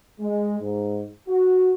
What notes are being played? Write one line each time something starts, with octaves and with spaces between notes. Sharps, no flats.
G#3
G#2
F#4